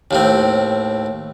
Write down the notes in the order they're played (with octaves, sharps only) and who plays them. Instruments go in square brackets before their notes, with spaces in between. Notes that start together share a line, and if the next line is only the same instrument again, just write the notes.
[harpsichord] D#2 A2 C4